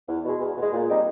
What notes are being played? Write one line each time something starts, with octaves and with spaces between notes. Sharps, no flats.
E2
B2 G#3
E2
B2
G#3
A#2
G3 C4 D#4